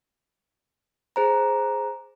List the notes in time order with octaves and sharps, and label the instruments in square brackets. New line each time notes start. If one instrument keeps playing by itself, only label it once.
[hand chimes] G#4 C5 A#5